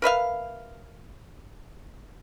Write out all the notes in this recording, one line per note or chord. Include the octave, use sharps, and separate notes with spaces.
A#4 B4 E5 F5